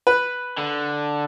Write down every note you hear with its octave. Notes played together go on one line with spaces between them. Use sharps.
B4
D3